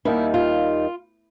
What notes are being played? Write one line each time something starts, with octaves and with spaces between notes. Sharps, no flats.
D#2 D#3 G3 E4
F4